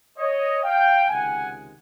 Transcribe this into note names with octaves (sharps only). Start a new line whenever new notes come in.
C#5 D#5
F5 G5
C#2 C3 D#3 G#3 F#5 G#5